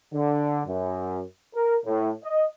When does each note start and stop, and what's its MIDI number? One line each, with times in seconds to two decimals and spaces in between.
0.13 0.60 50
0.66 1.21 42
1.55 1.76 70
1.85 2.09 45
2.24 2.43 75